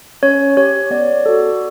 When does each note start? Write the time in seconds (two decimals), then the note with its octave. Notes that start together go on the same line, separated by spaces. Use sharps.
0.23 C#4 C#5
0.57 G4 C#5
0.91 B3 D5
1.26 F#4 A4